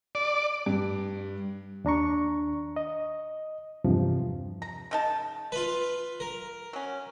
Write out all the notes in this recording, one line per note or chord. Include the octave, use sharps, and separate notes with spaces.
D5
G2
D#2 D4 A#5 C#6
D#5
E2 G2 C3 F3
A#5
C#3 D#4 A5
F4 B4
A#4
F#3 C#4